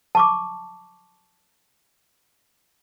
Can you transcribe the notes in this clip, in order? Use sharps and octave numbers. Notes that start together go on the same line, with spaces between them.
A5 C#6 D6